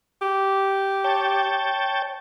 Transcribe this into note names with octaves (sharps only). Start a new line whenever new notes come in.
G4
C#5 G5 A5